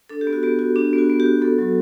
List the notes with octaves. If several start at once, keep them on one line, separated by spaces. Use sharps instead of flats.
D4 A4
G4
B3
F#4
B3 G4
F#4
D4 G4
B3
F#4
B3
G4
F#4
B3 A4
F#3